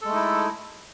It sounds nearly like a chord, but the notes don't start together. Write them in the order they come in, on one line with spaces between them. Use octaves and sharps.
A4 G#3 A3 D#4 E4